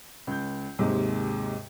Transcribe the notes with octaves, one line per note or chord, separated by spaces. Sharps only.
C#2 G6
D#2 G#2 C3 G#3